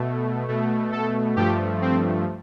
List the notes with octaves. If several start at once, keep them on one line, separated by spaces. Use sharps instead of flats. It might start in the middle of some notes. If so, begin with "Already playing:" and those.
Already playing: B2 A3
B2 A3
A4
G2 F3 A3 G4
C4